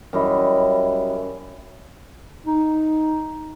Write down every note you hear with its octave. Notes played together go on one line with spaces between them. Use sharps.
F#2 G3 E4 D#5
D#4